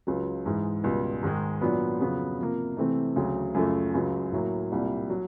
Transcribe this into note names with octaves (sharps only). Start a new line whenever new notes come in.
C#2 C#3 F#3
G#2 E3 G#3
C#2 B2 G3
G#2 D#3 G#3
A#2 F#3 B3 D4
F2 C#3 F#3 B3
C3 F3 A#3
C3 E3 A3 C4
D2 C#3 F#3
F#2 C#3 F3 A3
C#2 C#3 F#3
A2 F#3 A#3
C2 A#2 G3 A#3
F#3